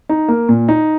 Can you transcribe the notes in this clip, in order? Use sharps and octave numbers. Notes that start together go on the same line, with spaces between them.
D#4
A#3
A#2
D#4